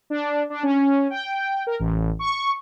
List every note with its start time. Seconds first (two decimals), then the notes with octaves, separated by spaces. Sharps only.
0.10 D4
0.50 D4
0.63 C#4
1.10 G5
1.67 A#4
1.80 A1
2.19 C#6